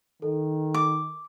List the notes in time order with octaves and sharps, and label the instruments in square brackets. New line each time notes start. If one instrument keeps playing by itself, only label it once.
[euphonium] D#3 [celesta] A4
[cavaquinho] D6